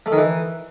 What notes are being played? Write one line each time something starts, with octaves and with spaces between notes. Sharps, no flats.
A3
D#3
E3